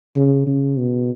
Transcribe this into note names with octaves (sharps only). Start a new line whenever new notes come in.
C#3
C#3
B2